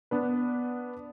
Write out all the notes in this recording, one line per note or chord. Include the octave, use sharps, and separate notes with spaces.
B3 D4 B4